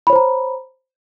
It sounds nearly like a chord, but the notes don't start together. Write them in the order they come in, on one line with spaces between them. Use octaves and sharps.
B5 C#5 C5 A#5